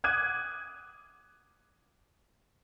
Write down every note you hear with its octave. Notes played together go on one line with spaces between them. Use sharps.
D6 D#6 F#6 G#6 D#7